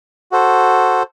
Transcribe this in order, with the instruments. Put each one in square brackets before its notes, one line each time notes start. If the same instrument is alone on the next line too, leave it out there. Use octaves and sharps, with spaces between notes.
[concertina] F#4 A4 C5